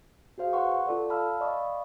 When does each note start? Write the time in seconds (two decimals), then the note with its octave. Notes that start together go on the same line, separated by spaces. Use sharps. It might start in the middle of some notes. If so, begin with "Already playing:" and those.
0.38 F#4 G#4 C5 F5
0.53 B4 F#5 C6 C#6
0.87 F4 A4 D5
1.10 F5 A5 B5 E6 F6
1.41 D5 D#5 F5 B5 C#6 D#6